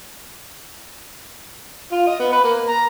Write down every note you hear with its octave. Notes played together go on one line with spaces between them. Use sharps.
F4
D#5
B3
B4
A#3
A#5